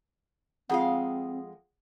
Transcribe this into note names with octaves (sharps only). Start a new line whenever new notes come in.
F2 G#3 C4 F4 G#4 F5 F#5